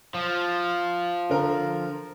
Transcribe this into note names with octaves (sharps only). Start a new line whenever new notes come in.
F3
D3 A#4